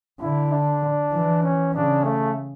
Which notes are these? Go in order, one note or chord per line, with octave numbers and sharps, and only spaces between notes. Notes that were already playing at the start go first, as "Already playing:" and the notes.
D3 E4
D4
E3
C#4
C#3 D4
A3